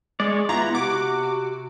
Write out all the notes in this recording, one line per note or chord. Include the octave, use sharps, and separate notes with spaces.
G#3 C#5 D5
B3 E4 F4 A#5
C3 F#4 D6